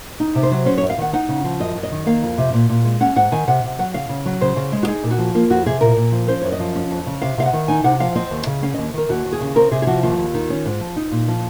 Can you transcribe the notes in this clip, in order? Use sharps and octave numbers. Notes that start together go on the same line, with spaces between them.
D#4
C3
C5
F#3
C#4 C5
F#2 C#5
F5
D#3 F#5
D#4 F#5
C#3
F3
F#2 D#5
F#2
D#5
D#3
A#3 F5
F2
C3
A#2
A#2
G#3
C#4 F#5
G#2 F#5
D#3 G#5
C3 F#5
C3
F#3 F#5
C#3 F5
C#3
F#3
C#3 C5
C#3
G#3
F#4
D#4 G#4
A#2
F#4
F3
A#3 F4
F2 F#4
C3 G#4
A#2 A#4
A#2
F3
C#4 C5
F#2 C#5
D#5
F3
C#4
F2
C#3
C3 F5
C3 F5
F#5
D#3
D#4 G#5
C3 F#5
F3 F5
C4 D#5
D#2
C#3
C#4 F5
D#2 D#5
D#3 A#4
D#2 F#4
D#2
G#4
C#3
C4 A#4
C3 G#4
G#4
F3 F#4
D#2 F4
D#2
D#3
C#4
G#2
F3
D#4
A#2
F3